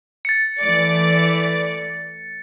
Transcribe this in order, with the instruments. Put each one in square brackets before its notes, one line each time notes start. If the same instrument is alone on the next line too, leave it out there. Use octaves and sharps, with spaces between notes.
[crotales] A6 C#7
[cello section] E3 A3 [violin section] D5